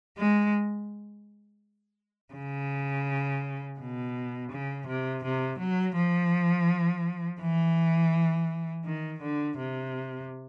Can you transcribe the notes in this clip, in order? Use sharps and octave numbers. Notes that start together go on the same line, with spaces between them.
G#3
C#3
B2
C#3
C3
C3
F#3
F3
E3
D#3
D3
C3